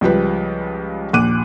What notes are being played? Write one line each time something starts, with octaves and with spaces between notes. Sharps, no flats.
C#2 F3 G3 B4
A#1 D#2 D6 F#6 D#7